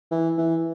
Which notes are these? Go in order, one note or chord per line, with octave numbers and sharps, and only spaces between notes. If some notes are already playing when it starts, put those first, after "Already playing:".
E3
E3